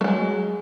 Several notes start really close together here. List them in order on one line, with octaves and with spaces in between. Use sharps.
A3 G#3 F#3